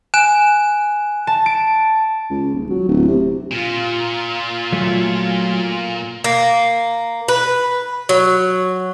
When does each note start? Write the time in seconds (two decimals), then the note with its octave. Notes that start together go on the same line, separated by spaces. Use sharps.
0.14 G#5 F#6 E7
1.27 A5
1.46 D7
2.30 C#2
2.54 D#1
2.70 F#3
2.89 D1
3.08 C3
3.52 A#2 F4
4.72 F#3 A3
6.24 A#3
7.28 B4
8.09 F#3